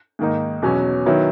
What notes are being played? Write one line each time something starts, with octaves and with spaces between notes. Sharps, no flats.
G#2 D#3 A#3 D#4
E2 B2 F#3 C#4
D#3 F#3 B3 E4